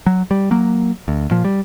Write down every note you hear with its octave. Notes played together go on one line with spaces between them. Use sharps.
F#3
G3
F#3 A#3
D2
A#2 F3
G3